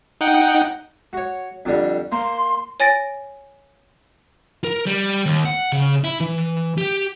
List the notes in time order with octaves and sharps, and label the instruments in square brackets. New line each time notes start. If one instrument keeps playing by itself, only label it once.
[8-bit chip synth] D#4 F#5 G5
[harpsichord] F#4 C#5
F2 D3 G3
[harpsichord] A#3 [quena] C6
[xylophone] C#5 G#5 A6 A#6 D7
[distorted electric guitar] A#4
G3
D#2
F#5
C#3
E4
E3
G4